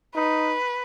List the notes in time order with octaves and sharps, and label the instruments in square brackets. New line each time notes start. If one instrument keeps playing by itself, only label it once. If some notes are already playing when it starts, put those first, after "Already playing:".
[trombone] D#4 [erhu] B4